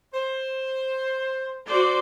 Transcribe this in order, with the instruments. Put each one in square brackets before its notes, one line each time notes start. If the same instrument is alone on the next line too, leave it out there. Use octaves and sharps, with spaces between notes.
[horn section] C5
[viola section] F#4 C5 D5